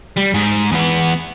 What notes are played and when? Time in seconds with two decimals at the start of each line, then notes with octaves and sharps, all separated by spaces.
0.17 G3
0.34 G#2
0.72 E2 B3